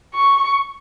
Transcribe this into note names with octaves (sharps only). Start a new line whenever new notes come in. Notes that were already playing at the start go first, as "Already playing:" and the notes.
C#6